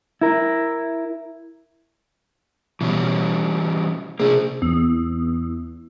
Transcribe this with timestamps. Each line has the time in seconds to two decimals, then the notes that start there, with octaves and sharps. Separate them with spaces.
0.21 E4 A#4
2.81 B2 E3 G3 C#4
4.20 C3 A#3 D4 G#4
4.62 E2